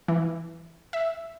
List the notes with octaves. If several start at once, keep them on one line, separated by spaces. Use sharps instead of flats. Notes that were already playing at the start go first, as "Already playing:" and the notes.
E3
E5